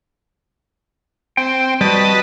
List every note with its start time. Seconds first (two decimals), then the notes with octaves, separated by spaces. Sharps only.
1.37 C4 G5
1.81 G3 F#4 B4 D#5 A5